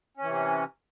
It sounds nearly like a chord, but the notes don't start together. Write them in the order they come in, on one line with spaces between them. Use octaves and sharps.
C#4 E3 C3